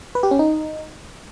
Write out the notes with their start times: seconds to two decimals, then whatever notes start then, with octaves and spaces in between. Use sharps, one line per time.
0.15 B4
0.23 G4
0.31 C#4
0.39 D#4